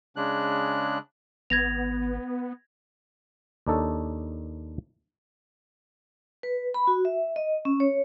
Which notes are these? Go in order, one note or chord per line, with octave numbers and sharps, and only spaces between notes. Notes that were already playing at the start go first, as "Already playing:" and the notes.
C#3 G#3 D4 F#6
G#1 B3 G#6 A#6 F7
D#2 D4 D#4 A4 C#5
B4
B5
F#4
E5
D#5
C#4
C#5